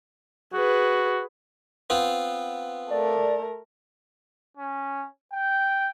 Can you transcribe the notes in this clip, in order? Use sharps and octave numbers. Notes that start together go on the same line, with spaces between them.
F#4 G#4 B4
B3 C4 F4
A3 A#4 D5
C#4
G5